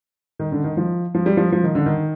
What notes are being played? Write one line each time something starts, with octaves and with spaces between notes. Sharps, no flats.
D#3
D3
D#3
F3
F3
G3
F3
F3
D#3
D3
D#3